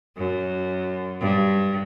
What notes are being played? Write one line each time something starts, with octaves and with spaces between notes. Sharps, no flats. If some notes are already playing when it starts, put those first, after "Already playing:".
F#2
G2